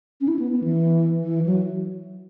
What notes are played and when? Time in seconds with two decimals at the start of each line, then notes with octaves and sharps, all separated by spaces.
0.21 C#4
0.28 E4
0.39 B3
0.52 B3
0.64 E3
1.23 E3
1.46 F#3